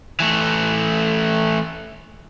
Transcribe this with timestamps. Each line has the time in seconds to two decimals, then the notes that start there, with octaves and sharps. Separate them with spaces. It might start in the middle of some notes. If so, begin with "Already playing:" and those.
0.20 E3 A3